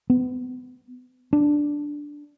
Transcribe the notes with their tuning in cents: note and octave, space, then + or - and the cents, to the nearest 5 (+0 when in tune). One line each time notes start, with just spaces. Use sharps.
B3 +30
D4 +0